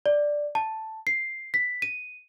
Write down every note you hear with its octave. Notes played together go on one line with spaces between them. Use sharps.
D5
A5
C7
B6
D#7